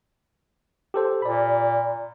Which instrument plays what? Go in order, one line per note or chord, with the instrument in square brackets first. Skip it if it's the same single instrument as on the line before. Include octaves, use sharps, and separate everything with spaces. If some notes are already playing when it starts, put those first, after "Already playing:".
[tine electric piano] G4 A4 C5
[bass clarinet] A#2 [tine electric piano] D5 B5